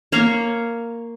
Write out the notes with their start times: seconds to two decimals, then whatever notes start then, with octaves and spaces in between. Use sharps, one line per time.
0.12 A#3 C#5 F5 A#5